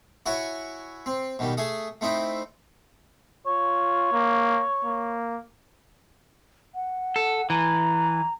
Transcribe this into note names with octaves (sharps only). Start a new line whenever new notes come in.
E4 F#4 C#5 G#5
C4
B2 D#3 G3
A3 G#4 G#5 A5
A3 C4 D#4 E4
F4 C#5
A#3
A#3
F#5
A4
E3 A#5